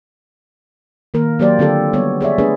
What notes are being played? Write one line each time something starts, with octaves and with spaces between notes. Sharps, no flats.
D#3 A#3 A#4
F#3 A#3 G4 C5 D5
D3 C4 F4 G4 A4
G3 B3 C#5
G#4 C#5 D5 E5
A3 B3 D4 G#4 B4 C5